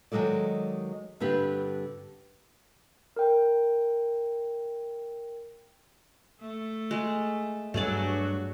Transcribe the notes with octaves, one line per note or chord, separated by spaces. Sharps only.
D#3 F#3 G#3 A4 D5
G2 D3 C4 G4 B4
A#4 G5
A3
G#3
G2 F#3 A3 F#4 G#4 D5